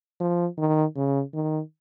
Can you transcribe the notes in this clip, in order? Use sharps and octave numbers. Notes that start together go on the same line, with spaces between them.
F3
D#3
C#3
D#3